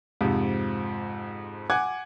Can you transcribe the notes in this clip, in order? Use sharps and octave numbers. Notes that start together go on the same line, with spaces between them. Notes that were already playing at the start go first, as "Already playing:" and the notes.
F2 G#2 C3 F3
F#5 G#5 D6 F#6 G#6